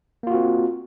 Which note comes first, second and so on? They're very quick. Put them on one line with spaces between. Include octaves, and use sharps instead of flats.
A#3 F4 F#4 C4